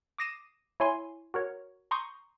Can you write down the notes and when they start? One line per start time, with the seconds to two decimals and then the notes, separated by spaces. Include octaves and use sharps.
0.18 D6 D#6 A#6 C7 D#7 E7
0.80 E4 C#5 G#5 C6
1.34 F#4 A#4 C#5
1.91 A#5 C6 C#6 D#6 G6